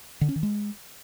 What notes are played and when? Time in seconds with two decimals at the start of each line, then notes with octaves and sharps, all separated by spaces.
0.21 D3
0.29 C#4
0.36 D#3
0.43 G#3